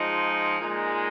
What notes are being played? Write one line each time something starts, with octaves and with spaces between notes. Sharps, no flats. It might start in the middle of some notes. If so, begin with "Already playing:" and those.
Already playing: F3 G#3 D#4
A#2 G#3 D#4